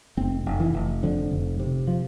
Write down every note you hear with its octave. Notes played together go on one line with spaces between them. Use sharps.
F1 C4
F1
E3
F1
F2 D3
F1
C3
F3